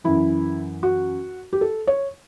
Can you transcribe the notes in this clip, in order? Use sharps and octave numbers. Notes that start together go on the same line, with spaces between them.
F#2 E3 E4
F#4
G4
A4
C#5